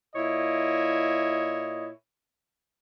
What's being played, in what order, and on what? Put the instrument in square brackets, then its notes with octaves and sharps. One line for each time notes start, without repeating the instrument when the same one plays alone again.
[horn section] A#2 E4 C#5 D#5